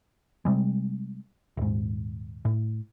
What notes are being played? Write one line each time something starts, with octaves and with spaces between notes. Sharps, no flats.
C3 G3 G#3
D#1 G#2
A2